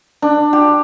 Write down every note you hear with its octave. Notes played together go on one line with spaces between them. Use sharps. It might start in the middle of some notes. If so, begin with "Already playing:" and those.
D4
G4